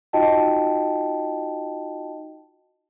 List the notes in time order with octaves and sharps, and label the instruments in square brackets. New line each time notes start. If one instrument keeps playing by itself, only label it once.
[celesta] D#4 F4 F#4 D#5 G5 A5